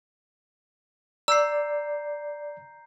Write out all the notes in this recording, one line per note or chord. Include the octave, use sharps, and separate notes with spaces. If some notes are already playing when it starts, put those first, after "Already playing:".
D5 A#5 E6 G6 C7